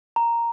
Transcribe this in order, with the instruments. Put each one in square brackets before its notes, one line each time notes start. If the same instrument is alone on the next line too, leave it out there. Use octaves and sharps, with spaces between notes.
[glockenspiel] A#5